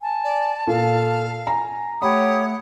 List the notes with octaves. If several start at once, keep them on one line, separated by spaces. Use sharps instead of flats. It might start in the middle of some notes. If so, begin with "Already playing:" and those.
G#5 A5
D5
A#2 A4 F5
G#5 A#5
A3 G4 C#5 F#5 B5 D#6